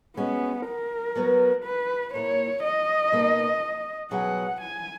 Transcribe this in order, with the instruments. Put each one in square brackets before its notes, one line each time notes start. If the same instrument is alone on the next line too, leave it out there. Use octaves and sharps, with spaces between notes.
[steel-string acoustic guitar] G#3 C#4 F#4 [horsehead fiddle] B3
[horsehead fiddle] A#4
[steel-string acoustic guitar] F#3 B3 F#4 B4
[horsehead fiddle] B4
[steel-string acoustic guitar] A#2 A#3 E4 [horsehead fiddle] C#5
[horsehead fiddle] D#5
[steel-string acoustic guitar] B2 A#3 D#4
[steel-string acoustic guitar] B2 F#3 C#4 G#4 [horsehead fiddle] F#5
[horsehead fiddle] G#5